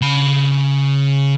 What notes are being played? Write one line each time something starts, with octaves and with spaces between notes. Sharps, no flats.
C#3 B5